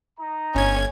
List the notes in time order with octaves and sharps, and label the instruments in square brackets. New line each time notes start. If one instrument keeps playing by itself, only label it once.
[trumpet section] D#4 A#5
[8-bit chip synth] G1 G#6 [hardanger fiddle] C#4